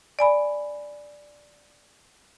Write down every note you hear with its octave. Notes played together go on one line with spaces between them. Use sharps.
D5 G#5 B5